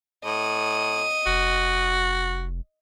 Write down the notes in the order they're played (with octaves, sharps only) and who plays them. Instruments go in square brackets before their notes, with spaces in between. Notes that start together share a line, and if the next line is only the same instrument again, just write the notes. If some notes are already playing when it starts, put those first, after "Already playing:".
[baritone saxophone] A2 [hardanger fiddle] D#5
[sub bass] F1 [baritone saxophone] F#4